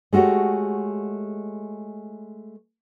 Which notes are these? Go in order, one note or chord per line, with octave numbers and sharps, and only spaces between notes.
G#3 A3 F#4 G4 C#5